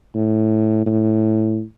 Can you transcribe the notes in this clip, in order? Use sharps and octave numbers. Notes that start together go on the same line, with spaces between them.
A2
A2